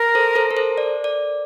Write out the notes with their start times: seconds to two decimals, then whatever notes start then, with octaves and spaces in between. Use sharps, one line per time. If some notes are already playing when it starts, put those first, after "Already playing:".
Already playing: A#4
0.15 A4 C5
0.35 A4 C5
0.51 A#4
0.57 A4 C5
0.78 D5
1.04 D5